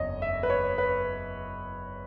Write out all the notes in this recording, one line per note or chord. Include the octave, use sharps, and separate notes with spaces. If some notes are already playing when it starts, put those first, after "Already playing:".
Already playing: F#1 E2 C#5 D#5
E5
B4
C#5
B4